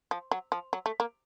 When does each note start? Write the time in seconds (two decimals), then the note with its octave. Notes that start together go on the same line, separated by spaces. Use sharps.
0.11 F3
0.32 F#3
0.52 F3
0.73 F#3
0.86 A3
1.00 A#3